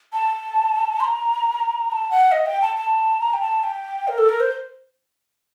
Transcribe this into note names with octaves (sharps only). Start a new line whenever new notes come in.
A5
C6
A#5
A#5
A5
F#5
D#5
G5
A5
A5
A#5
G5
A5
G5
A#4
A4
A#4
C5